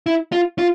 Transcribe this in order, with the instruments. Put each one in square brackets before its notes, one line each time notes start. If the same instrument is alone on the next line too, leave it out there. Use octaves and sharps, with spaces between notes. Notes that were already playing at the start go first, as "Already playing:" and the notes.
[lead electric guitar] E4
F4
F4